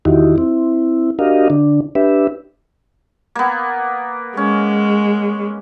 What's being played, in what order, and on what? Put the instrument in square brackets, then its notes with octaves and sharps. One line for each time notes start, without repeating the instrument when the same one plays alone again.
[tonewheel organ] E2 D#3 D#4 E4 F#4 G4
C4 E4
D4 F#4 G4 A#4 D#5 F5
D3 D4
D4 G4 B4 E5
[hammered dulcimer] A#3 B3
[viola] G#3 [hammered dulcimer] C#4